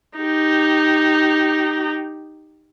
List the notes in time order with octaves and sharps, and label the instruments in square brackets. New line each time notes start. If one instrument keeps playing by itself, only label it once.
[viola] D#4 G4